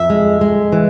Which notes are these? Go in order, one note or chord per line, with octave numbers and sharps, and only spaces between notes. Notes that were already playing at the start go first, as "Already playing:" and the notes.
Already playing: F2 E5
G#3
G#3
E3